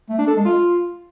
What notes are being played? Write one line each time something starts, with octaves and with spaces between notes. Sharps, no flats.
A3
D4
A4
G#3
F4